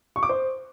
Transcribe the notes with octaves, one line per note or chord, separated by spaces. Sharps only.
C#6
D6
C5